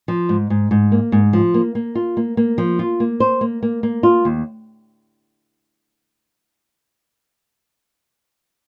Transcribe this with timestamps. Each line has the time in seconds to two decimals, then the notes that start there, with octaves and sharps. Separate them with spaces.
0.08 F3
0.29 G#2
0.50 G#2
0.71 G#2
0.92 A#3
1.12 G#2
1.33 F3
1.54 A#3
1.75 A#3
1.95 F4
2.17 A#3
2.37 A#3
2.58 F3
2.79 F4
3.00 A#3
3.20 C5
3.41 A#3
3.63 A#3
3.83 A#3
4.03 F4
4.25 D#2